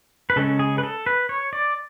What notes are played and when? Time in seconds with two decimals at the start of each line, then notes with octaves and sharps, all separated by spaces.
0.30 B4
0.36 C#3 G#3 C#4 A4
0.59 G#4
0.78 B4
0.83 A4
1.06 B4
1.29 C#5
1.53 D5